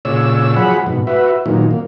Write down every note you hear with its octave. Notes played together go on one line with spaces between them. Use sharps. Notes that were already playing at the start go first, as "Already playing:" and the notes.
A#2 C#3 C#5 D5 E6
F3 F#3 G#4 F#5 B5
G#2 B2
F#4 B4 E5
A#2 D#3 F#3
A#3